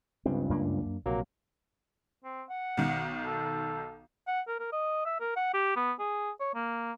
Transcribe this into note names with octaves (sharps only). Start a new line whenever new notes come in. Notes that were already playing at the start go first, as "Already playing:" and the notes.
C#2 G2 C4
F#2 A#3 D4
A#1 C3 F#3 A#3
C4
F#5
B1 D#3
A4
F#5
A#4
A#4
D#5
E5
A#4
F#5
G4
B3
G#4
C#5
A#3